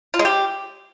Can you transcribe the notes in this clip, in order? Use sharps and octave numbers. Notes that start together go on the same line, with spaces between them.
F4
G#3
G4